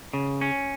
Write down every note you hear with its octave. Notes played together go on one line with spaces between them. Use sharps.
C#3
C#4